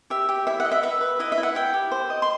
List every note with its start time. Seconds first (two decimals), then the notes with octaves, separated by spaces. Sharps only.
0.10 G4 E5
0.29 G4
0.47 E4 E5
0.60 F#5
0.65 D#5
0.72 E5
0.83 B4 E5
1.01 B4
1.19 E4 D#5
1.32 E5
1.38 E4
1.43 F#5
1.55 E4 G5
1.74 G4
1.92 C5
2.10 D#5
2.22 C6